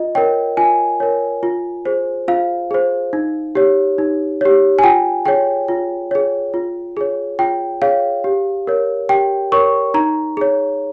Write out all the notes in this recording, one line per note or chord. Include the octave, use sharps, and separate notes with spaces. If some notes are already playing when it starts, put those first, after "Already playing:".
Already playing: F4 D#5
A#4 C#5 G5
F4 G#5
A#4 C#5
F4
G#4 C5
F4 F5
G#4 C5
D#4
G4 C#5
D#4
G4 C#5
G#5
F4 G5
G#4 C#5 G5
F4
G#4 C#5
F4
G#4 C#5
F4 G5
G#4 C#5 F5
G4
A#4 C#5
G4 G5
A#4 C#5 C#6
D#4 A#5
G#4 C#5